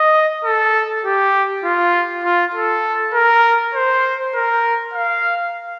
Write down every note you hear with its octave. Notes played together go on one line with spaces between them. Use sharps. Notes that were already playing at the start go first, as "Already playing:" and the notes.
Already playing: D#5
A4
G4
F4
F4
A4
A#4
C5
A#4
F5